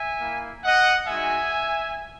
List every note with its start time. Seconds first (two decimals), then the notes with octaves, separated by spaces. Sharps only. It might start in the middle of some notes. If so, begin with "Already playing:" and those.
Already playing: E5 G#5
0.21 A#3 E4
0.64 D#5 F#5
1.07 G#3 D#4 F#4 E5 G#5